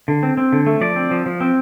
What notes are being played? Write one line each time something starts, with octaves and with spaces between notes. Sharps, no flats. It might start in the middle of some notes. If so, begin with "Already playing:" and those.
D3
C4
C4
D3
A3
F3 D5
C4
F3
F3
C4